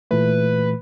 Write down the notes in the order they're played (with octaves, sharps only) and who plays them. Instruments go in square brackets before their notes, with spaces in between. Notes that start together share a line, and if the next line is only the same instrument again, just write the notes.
[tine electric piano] A#2 E3 A3 [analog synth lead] B4